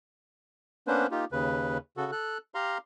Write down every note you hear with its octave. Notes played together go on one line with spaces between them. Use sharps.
A#3 B3 C#4 D4 B4 C5
A#3 D#4 F4 G4
D#2 C#3 B4
C#3 F#4 A4
A4 F#6
G4 F5 A#5 C6